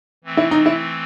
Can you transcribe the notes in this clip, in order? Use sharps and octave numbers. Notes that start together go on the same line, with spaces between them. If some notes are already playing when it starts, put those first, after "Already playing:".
E3 A3 C4
E4
D#4
E4